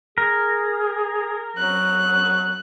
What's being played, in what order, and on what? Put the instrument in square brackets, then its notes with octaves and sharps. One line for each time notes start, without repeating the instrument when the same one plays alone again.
[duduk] G#4 [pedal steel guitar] A#4
[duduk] F#3 [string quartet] F#6